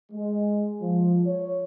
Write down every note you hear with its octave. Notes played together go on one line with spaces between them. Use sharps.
G#3
F3
C#5